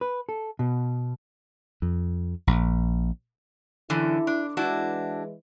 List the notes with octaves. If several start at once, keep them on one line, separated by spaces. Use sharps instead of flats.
B4
A4
B2
F2
A#1
F#2 D3 E3 E4
D4
E3 G#3 D4 E4 F#4